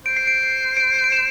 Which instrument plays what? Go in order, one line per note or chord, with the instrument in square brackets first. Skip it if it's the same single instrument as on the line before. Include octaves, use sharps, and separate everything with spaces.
[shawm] C5 [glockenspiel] D7
[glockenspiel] C7
D7
D7
D7
E7